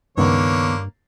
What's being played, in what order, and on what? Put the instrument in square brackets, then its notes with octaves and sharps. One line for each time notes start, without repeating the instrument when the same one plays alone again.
[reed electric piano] C#2 D#3 B3 [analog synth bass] G2 [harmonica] D3 A#3 C#5